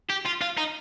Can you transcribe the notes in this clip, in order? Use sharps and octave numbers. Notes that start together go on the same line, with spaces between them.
G4
F4
F4
D#4